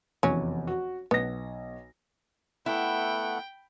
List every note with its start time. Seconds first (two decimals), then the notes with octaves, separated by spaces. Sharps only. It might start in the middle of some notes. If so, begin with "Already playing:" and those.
0.23 F1 E2 F#3 C#4
0.67 F#4
1.11 B1 B3 A#6
2.66 A3 B3 E4 F#5 G5